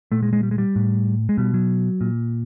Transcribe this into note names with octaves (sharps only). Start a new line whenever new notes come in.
A#2 A3
G#3
G#3
G3
G#3
G3
A2
G#3
B2 G3
F#3
A#2